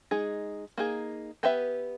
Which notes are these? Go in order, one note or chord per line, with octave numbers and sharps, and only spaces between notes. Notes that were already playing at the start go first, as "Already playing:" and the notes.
G#3 D#4 G#4
A#3 D#4 G#4
B3 G4 B4 E5